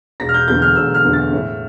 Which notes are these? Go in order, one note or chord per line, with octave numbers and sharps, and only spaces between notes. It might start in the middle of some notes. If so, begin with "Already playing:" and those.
E1 A#6
F6
G6
E2 D3 A3 G6
F6
E1 E6
F6
E2 D3 A3
A6
A2